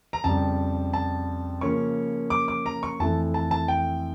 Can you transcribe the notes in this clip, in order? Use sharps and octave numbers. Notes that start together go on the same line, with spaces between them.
A#5
F2 C#3 G3 A5
A5
C#3 F3 A#3 C#4 C#6
D6
D6
A#5
C#6
F2 E3 A3 A5
A5
A5
G5